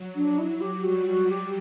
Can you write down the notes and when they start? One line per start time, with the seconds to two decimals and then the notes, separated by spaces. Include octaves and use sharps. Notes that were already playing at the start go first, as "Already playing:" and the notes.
Already playing: F#3
0.16 D4
0.39 E4
0.61 G4
0.84 G3 F#4
1.07 F#4
1.29 G4